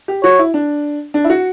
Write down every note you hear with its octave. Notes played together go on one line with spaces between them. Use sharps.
G4
F#4 C#5
E4
D4
D4
E4
F#4